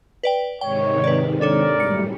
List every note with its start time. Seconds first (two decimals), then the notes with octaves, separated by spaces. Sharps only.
0.23 B4 D5 G5
0.61 G#2 C3 D#3 C#5 G5
1.04 B4 D5
1.41 D4 A4 A#4 C#5 D5
1.80 F#2 A2 G3 C#7